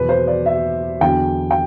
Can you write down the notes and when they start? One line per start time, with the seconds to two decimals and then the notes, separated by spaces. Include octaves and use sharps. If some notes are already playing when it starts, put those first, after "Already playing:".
Already playing: E2 B2 F#3 B4
0.09 C5
0.27 D5
0.46 E5
1.01 E2 D3 F#3 G5
1.51 G5